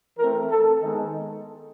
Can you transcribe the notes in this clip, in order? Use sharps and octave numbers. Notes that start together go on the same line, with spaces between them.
E3 A3 C4 A#4
A4
D#3 G#3 B3 D#4